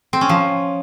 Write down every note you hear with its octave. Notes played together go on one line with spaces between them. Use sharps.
C4
C#4
F3